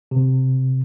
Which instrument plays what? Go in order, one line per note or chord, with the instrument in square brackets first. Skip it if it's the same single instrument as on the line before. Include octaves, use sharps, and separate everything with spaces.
[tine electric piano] C3